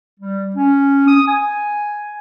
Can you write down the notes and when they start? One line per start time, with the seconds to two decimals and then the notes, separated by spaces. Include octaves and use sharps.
0.20 G3
0.56 C#4
1.08 D#6
1.27 G#5